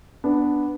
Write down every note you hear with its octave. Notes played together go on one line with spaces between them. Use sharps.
B3 D4